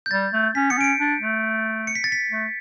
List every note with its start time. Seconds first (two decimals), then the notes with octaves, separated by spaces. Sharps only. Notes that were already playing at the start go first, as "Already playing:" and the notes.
0.06 G6
0.11 G3 A6
0.33 A3
0.55 C#4 B6
0.70 B3 C#7
0.78 C#4 D7
0.84 C#7
1.00 D4
1.21 A3
1.87 C#7
1.95 B6
2.04 A6
2.12 B6
2.31 A3